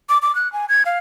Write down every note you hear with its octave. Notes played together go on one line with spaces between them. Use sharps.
D6
D6
F#6
G#5
G#6
F5